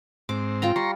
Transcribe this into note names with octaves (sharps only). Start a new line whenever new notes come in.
G#2 C4 D6
F4 G5 A#5
G3 A#5 C6 C#6